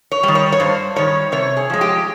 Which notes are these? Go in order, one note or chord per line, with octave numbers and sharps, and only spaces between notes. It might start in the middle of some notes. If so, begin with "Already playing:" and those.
C#5
D#3 G3
C#5
C#5
G2 C5
D#3 G3 C#5
C3 C#5
G#4
F3 G#3
G4